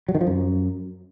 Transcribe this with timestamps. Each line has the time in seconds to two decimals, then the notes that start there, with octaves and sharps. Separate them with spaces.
0.09 F#3
0.15 D#3
0.21 F3
0.27 F#2